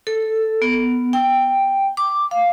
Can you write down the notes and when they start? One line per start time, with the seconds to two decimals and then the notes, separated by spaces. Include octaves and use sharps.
0.07 A4
0.62 B3
1.13 G5
1.97 D6
2.31 F5